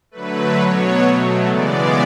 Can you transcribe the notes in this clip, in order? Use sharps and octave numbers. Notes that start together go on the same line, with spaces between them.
D3 F#3 A3 B4
B2 F#3 B3 C#5
B2 F#3 A3
C#3 E3 G#3 B3 D5